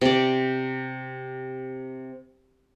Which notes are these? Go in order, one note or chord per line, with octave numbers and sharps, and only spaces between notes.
C3 D5